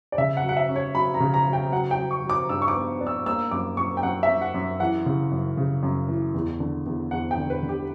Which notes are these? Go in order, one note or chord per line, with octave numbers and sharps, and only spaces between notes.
D5
C#3 E5
F#5
F#3
F#5
E5
C#4
C#5
F#3 B5
A#5
C#3
A#5
F#3
G5
F#3 F#5
G5
F#3
C#6
F#3
D6
G2 E6
C#6
D6
B3
D4
E6
A#3 E6
F#2 D6
F#2 C#6
G5
F#2 F#5
E5
F#2
F#5
F#2
E3 F#5
C#3
F#2
C#3
F#2
E3
E2
D3
E2
E2 F#5
G5
D3
B4
D3
G4